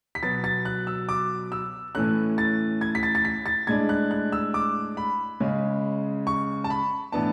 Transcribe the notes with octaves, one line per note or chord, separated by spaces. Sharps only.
B6
B2 F#3 B3 A6
A6
F#6
E6
D6
E6
A2 E3 A3 C#4 F#6
A6
G#6
B6
A6
A6
B6
A6
A2 G#3 D4 G#6
F#6
F#6
E6
D6
B5
C#3 G#3 C#4
C#6
A5
B5
A2 E3 B3 D4 A5